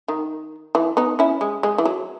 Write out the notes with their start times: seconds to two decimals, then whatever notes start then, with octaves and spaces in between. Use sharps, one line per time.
0.08 D#3
0.75 E3
0.97 B3 D#4
1.19 C#4 E4
1.41 G#3
1.63 G#3
1.78 E3
1.85 F#3